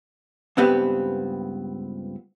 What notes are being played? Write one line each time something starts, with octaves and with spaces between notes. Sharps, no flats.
C#2 G2 B3 C4 G4 B4